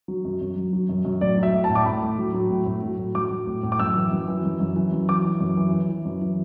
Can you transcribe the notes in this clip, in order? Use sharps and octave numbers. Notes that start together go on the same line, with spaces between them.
F#3
F#2
F#2
F#2
F#3
F#2
F#2
A2 D5
F#3
E5
A2
A5
A2
D6
A2 B5
A2
F#3
F#3
A2
A2
F#3
A2
F#3 D6
F#3
A2
A2
D6
F#2 E6
E3
F#2
E3
F#2
F#2
E3
F#2
E3 D6
E3
F#2
E3
E3
E3
F#2
E3